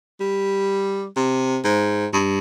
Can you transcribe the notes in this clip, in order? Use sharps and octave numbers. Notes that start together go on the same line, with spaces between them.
G3
C3
G#2
G2